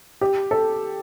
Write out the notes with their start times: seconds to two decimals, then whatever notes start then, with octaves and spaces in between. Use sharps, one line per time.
0.21 G4
0.51 A4